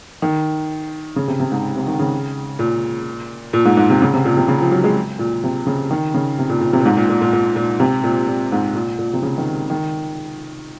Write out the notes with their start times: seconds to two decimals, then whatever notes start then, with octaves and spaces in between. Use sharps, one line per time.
0.22 D#3
1.16 C#3
1.28 C3
1.40 C3
1.52 G#2
1.76 C3
1.87 D#3
1.99 C#3
2.59 A#2
3.53 A#2
3.65 G#2
3.77 G#2
3.90 C3
4.02 C#3
4.14 C3
4.25 A#2
4.37 C3
4.48 C#3
4.61 F3
4.72 F#3
4.84 G#3
5.19 A#2
5.44 C3
5.67 C#3
5.91 D#3
6.14 C#3
6.39 C3
6.49 A#2
6.61 A#2
6.73 C3
6.80 A#2
6.86 G#2
6.97 A#2
7.09 A#2
7.21 A#2
7.33 A#2
7.56 A#2
7.80 C3
8.04 A#2
8.28 A#2
8.52 G#2
8.75 A#2
8.99 A#2
9.13 C3
9.22 C#3
9.38 D#3
9.70 D#3